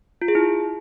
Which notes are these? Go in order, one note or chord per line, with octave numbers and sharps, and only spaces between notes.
F4
G#4
E4